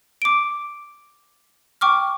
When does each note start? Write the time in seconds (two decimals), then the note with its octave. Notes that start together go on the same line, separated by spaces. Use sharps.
0.22 D6 D7
1.81 G5 C#6 D6 F6